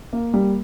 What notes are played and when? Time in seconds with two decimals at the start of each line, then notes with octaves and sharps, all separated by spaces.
0.13 A#3
0.34 G3